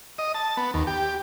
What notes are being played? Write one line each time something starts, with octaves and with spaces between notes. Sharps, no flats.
D#5
A5
B3
D#2
G4